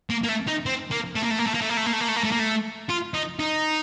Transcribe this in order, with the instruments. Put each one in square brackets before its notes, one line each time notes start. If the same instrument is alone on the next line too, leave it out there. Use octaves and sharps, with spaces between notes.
[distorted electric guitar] A#3
A#3
A3
D#4
C4
A#3
A3
A#3
A3
A#3
A3
A#3
A3
A#3
A3
A#3
A3
A#3
A3
A#3
A3
A#3
A3
F4
D#4
D#4